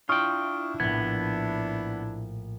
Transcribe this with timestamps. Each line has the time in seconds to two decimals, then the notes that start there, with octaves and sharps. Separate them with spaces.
0.09 D4 E4 F4 G5 C#6 D#6 F6
0.80 A#1 A2 B3 G#6